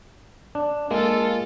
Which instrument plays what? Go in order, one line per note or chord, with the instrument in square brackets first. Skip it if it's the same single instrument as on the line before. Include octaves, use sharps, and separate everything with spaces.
[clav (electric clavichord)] D4
[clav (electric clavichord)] G#3 A#3 [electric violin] F4 A4